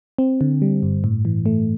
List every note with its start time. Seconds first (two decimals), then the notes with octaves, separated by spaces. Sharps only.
0.18 C4
0.41 D3
0.62 G3
0.83 G2
1.04 A2
1.25 E3
1.46 A3